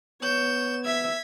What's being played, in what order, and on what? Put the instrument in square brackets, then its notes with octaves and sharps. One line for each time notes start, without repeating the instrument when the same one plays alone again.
[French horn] B3 [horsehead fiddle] C#5 [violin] G6 E7
[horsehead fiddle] E5 [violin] G#6 B6